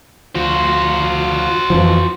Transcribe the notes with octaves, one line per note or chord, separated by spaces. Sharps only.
D2 F3 F4 F#4 C5
F2 E3 F3